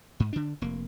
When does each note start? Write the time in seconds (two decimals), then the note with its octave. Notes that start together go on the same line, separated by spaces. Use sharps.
0.20 G#2
0.33 D3 D4
0.62 F1 A#3